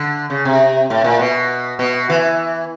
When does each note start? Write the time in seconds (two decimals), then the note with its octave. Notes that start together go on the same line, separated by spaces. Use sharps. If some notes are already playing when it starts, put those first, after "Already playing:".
Already playing: D3
0.30 C#3
0.45 C3
0.90 A2
1.04 A#2
1.19 B2
1.79 B2
2.10 E3